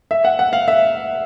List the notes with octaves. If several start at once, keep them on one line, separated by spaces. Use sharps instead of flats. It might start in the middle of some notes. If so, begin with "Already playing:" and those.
E5
F#5
F#5
F5
E5